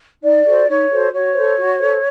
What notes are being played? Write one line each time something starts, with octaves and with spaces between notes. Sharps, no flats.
D#4 D5
F#4 A4 C5
D#4 C#5
F#4 A4 C5
F#4 C#5
A4 C5
F#4
A4 C5